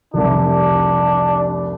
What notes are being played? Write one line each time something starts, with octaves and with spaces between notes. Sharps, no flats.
F1 C2 D4